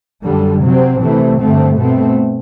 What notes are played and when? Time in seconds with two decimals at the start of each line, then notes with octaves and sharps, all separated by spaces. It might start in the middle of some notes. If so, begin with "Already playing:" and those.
0.25 F#2 D3 G3
0.62 C3 F#3 C4
1.00 C3 E3 A3 C4
1.39 G2 D3 A3 C4
1.77 B2 A3 C4